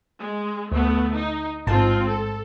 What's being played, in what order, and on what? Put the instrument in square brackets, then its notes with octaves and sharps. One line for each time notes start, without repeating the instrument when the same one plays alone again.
[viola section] G#3
[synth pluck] D2 [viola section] A3 B3
[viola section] D#4
[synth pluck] A1 G#2 A5 [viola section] C4 F4
[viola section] A4